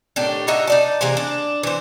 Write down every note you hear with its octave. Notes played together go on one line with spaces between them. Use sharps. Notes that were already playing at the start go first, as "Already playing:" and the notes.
A2 D#3 D4 G4
D#4 F#4 D#5 E5
D#4 D5 A5
C3 E3 G#3 A#3
D4
E3 C5